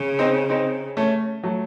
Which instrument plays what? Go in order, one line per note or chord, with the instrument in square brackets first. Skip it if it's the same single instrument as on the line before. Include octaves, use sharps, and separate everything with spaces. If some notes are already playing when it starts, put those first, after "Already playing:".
Already playing: [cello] C#3
[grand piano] C4 D#4
C4 D#4
A3 C#4
F#3 A3